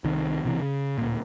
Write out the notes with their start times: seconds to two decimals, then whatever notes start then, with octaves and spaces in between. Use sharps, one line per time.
0.04 C2 C3 D#3
0.44 B1 C3 E3
0.62 C#3
0.98 D1 A#2